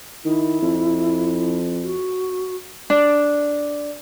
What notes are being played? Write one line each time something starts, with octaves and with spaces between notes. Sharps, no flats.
D#3 E4
F2
F#4
D4